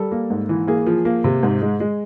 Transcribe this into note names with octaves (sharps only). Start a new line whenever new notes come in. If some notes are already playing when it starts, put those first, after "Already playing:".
Already playing: G3 A4
A#3
G#2
E3
A#3 G#4
F3
A#3
C3
G#2
G#3
G#3